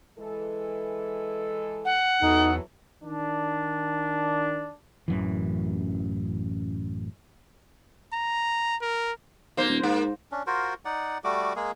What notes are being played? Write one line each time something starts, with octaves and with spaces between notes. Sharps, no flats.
E3 G#3 A4
F#5
E2 E3 F#3 D#4 A4
D#3 D4
A1 F#2 E3
A#5
A#4
B1 A#3 C5
D#1
G#2 A#3
C#4 D4
F4 F#4 A#4 C5
D#4 D5 F#5
G3 A3 F#4 D6
G#3 A#3 G#4